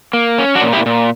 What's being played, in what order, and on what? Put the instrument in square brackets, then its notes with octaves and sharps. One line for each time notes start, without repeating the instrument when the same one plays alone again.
[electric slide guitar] A#3
C#4
D4 F#4
A#2
E4 G4
A#2